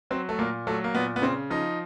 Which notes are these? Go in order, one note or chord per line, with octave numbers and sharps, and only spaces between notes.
F#3 C4
A3
A#2 A#3
F#3 A3
A#3
A#2 B3
B3
C#3 C4
F3 D#4